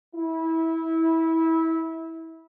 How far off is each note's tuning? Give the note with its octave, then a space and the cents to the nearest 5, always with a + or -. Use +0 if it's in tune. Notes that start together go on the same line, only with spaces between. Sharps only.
E4 -20